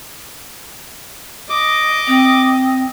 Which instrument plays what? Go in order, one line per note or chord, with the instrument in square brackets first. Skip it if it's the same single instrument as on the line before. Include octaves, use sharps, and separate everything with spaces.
[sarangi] D#5 [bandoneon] D6
[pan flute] C4